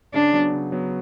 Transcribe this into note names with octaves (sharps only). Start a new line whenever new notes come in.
C#3 D4
F#3 B3
C#3
F#3 B3